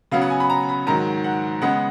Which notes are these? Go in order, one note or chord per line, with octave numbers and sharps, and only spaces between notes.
C#3 F#3 B3 F5
F#5
G#5
B5
A#5
B5
G#2 D#3 F#3 A#5
F#5
C#3 G#3 B3 F#5